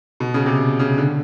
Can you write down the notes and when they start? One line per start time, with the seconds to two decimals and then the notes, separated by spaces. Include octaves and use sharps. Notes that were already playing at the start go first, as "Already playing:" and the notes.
0.20 B2
0.34 C#3
0.46 C3
0.79 C#3
0.98 D3